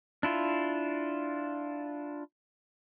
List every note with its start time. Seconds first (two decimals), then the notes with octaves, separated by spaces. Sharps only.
0.23 D4 E4 F4